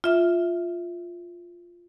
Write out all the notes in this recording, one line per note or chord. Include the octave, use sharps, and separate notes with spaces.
F4 E5 F6